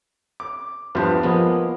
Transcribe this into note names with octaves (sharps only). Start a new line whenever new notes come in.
D6
E2 G2 F3 B4 C5
F3 G#3 A#3 B3